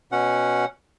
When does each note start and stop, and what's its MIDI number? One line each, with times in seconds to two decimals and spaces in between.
0.12 0.65 47
0.12 0.65 61
0.12 0.65 78